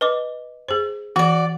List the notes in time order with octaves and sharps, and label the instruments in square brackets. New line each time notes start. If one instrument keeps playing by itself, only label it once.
[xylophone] B4 D#5 D6
[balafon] G#4 C5
[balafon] E3 [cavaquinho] F#4 D5